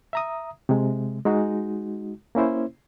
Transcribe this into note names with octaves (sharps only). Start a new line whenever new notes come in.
E5 A#5 D#6
C3 G#3
G#3 D#4 F#4
A#3 C#4 E4 C5